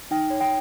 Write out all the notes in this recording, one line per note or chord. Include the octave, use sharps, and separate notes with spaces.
D#4 G5
C#5
G5